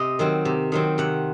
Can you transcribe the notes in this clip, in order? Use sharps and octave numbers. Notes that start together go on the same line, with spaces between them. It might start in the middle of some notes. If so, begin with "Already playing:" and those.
Already playing: C3 D#5
D#3 F#3 C4
C3
D#3 F#3 C4
C3 F#5